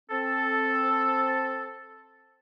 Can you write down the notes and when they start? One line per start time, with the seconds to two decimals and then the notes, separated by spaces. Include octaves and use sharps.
0.10 C4 A4